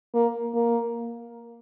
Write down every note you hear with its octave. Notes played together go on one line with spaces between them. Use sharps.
A#3
A#3